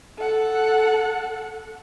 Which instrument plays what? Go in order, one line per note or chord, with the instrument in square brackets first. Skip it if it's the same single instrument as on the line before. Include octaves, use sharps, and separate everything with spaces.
[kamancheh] A4 F#5